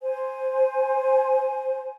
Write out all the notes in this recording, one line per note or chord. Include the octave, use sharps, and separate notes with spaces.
C5 G#5